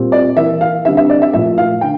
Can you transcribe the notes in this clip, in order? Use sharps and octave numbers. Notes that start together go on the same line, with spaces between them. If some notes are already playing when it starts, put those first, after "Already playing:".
Already playing: A#2 G3 C4
D5
E3 A#3 E5
F5
D3 G3 C4 E5
E5
D5
E5
A#2 F3 A3 E5
F5
D3 G5